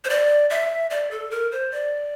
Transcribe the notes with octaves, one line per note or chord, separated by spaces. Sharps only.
C5
D5
E5
D5
A4
A#4
C5
D5